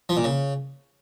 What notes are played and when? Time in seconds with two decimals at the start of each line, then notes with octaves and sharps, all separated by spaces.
0.09 F3
0.17 A#2
0.24 C#3